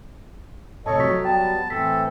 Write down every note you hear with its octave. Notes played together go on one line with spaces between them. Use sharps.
A2 C3 A4 C#5 D#5 A5
F#3 C#6 B6
G3 B3 G5 A5
A2 E3 C4 A4 B6